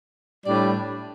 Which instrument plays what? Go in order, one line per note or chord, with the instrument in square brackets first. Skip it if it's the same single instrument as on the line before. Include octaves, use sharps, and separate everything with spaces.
[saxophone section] A2 G3 D4 G4 D5